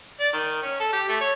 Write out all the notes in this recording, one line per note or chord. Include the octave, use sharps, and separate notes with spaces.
D5
D#3
C#4
A4
G4
A3
C#5